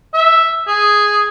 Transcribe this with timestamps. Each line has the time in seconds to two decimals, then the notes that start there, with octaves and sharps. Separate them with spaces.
0.14 E5
0.67 G#4